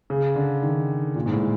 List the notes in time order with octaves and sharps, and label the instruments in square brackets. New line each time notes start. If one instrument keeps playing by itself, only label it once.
[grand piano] C#3
D3
D#3
A#2
G#2
A2